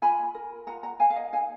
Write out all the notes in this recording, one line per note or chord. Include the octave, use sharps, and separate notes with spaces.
F4 G#5 B5
A#4
F4 F#5 A#5
F#5 A#5
A#4 F5 G#5
F5
D#5 F#5
D#4 F5 G#5